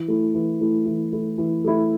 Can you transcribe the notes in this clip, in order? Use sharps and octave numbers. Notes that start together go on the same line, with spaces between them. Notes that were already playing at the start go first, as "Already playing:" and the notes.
Already playing: E3
A3 E4
E3
A3 E4
E3
A3 E4
E3
A3 E4